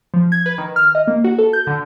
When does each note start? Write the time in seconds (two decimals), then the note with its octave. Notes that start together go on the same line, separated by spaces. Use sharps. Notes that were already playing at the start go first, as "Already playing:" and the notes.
0.14 F3
0.32 G#6
0.46 B4
0.58 D#3
0.76 F6
0.95 D#5
1.07 A#3
1.24 F#4
1.39 A4
1.53 G6
1.67 D3